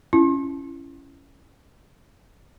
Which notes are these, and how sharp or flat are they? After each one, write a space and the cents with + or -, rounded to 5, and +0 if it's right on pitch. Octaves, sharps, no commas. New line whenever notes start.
C#4 +0 E4 +30